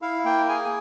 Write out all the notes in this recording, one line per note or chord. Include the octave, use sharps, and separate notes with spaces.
E4 F5
A#3 G5
G#4 G#5